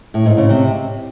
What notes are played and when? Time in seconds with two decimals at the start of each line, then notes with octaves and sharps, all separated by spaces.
0.14 A2
0.26 G#2
0.37 C#3
0.49 C3